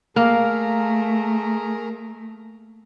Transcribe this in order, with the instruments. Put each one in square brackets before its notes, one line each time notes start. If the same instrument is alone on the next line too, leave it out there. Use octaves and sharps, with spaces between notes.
[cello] A3 [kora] A#3 [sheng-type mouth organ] G#4 A#4 A#5 [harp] F5